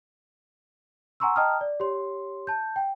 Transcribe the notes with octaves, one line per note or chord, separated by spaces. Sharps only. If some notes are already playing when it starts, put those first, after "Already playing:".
F#5 G#5 A#5 C6 C#6 E6
D#5 G5 A5 A#5 D#6 F6
D5
G4 C#5 C6
A5 G6
G5